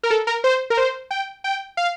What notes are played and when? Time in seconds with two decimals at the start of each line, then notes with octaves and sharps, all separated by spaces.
0.03 A#4
0.11 A4
0.27 A#4
0.44 C5
0.70 A#4
0.77 C5
1.11 G5
1.44 G5
1.77 F5